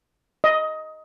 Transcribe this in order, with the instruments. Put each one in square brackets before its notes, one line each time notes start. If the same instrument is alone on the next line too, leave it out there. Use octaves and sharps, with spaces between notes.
[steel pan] D#5